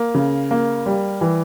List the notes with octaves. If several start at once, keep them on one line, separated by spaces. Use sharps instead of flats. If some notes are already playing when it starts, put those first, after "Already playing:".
Already playing: A#3
C#3
A#3
G3
E3